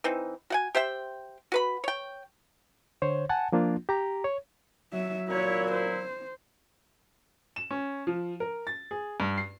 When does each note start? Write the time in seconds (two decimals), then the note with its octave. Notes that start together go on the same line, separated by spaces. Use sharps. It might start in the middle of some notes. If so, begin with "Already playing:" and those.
0.04 E3 C4 D#4
0.50 F#4 F#5 G#5
0.75 G4 C5 E5 G5
1.52 F#4 B4 B5
1.84 C#5 G5
3.02 D3 C5 C#5
3.29 F#5 G#5 A5
3.52 F3 A#3 D4 F4
3.89 G4 A#5
4.24 C#5
4.93 F#3 E5
5.28 A#2 F#3 E4 F#4 C#5
5.71 C5
7.56 E7
7.71 C#4
8.07 F3
8.40 A#4
8.67 A6
8.91 G#4
9.20 G2
9.38 C7